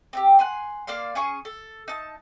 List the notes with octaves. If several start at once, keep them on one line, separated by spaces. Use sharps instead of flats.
C4 D#4 G4
F#5 G#5 C6
A#3 D5 F5 C6
C#4 G#4 G#5 C#6
A4
D#4 A5